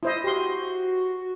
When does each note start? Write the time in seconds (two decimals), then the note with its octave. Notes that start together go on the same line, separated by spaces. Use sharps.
0.03 E4 C5 D#5
0.24 F#4 G4 C6